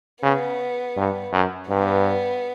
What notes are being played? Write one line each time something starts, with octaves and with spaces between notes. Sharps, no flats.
C#3 B3
G2
F#2
G2 B3